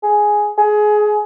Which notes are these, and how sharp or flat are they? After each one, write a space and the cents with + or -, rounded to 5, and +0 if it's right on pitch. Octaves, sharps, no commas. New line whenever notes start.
G#4 +5
G#4 +20